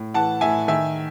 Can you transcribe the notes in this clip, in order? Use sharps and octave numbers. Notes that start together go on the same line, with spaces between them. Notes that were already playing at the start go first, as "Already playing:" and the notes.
Already playing: A2
E3 F#5 A5
A2 E5 G#5
D#3 E5 G#5